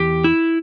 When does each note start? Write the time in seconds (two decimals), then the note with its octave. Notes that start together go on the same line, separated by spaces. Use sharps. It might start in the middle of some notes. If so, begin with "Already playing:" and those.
Already playing: E2 E3 G4
0.24 E4